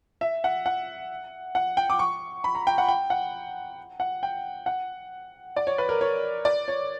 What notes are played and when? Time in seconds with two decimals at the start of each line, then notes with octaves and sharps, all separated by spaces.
0.21 E5
0.44 F#5
0.66 F#5
1.55 F#5
1.77 G5
1.90 D6
1.99 C#6
2.44 B5
2.55 A#5
2.67 G5
2.78 F#5
2.88 G5
3.10 F#5
4.00 F#5
4.23 G5
4.66 F#5
5.56 D5
5.67 C#5
5.78 B4
5.89 A#4
6.01 C#5
6.45 D5
6.68 C#5